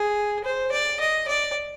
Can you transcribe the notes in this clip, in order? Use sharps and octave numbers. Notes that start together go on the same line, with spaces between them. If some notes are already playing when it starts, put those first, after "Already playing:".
Already playing: G#4
C5
D5
D#5
D5